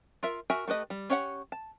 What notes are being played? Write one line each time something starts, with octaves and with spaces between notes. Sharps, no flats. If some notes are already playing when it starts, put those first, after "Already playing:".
F4 A#4 E5
F#4 A#4 E5 G#5
A3 G4 B4 D#5
G3
C#4 G4 C#5 F5 F#5
A5